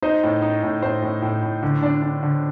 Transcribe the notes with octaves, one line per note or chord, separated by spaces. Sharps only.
D#4 C5 D#5
A2
D#4
A2
A2 C5
A2
A2
A2
D3
D4
D4
D3